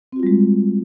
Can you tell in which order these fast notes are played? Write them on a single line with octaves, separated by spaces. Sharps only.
C4 F#4 F4 G3 G#3